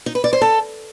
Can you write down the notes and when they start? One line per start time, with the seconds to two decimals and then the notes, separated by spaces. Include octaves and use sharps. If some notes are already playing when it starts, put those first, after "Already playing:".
0.06 D#4
0.15 B4
0.24 D5
0.33 C5
0.41 A4